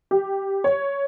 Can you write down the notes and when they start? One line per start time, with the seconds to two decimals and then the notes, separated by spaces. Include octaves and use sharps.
0.11 G4
0.64 C#5